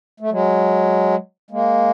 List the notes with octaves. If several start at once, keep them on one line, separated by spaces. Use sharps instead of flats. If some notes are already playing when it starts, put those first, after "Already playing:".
A3
F#3 G#3
G#3 A#3